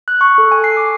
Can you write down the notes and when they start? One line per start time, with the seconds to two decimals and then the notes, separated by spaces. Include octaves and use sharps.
0.08 F#6
0.21 C#6
0.38 A4
0.52 G#5
0.64 C7
0.77 D6